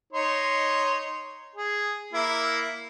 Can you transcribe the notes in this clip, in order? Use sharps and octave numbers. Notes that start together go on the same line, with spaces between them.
D#4 C#5 C6
G#4
A#3 E4